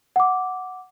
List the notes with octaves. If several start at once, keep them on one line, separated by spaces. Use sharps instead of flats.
F#5 D6